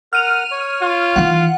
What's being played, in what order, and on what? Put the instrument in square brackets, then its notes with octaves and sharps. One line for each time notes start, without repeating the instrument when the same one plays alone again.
[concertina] A#4 F#5 [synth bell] F6 D#7 F7
[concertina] C#5
[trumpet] F4
[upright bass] D#3 E3 [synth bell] F#5